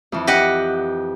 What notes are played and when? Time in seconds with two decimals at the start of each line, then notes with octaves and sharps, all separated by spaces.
0.12 F2 E3
0.27 G4 D#5 F#5